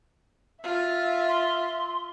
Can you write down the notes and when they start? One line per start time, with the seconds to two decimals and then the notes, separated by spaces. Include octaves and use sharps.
0.64 F4 E5
1.28 C6